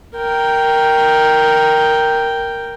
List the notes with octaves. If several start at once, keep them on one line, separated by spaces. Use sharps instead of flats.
A#4 G5